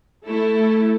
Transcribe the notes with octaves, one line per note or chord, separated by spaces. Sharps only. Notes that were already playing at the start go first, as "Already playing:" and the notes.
A3 E4 A4